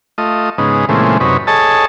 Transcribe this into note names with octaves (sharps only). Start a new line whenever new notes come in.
A3 F4 D#5
G#2 C#3 B3 D#4
A#2 C#3 E3 G#3 A3 C4
F#2 C3 C#4 D#4 B4
G#4 A4 C#5 D#5 A5